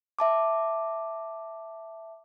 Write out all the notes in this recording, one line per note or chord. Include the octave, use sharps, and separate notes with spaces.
E5 A5 D6